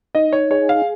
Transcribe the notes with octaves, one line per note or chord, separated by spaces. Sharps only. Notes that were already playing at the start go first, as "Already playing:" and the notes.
D#4 D#5
C#5
G#4 C#5
F5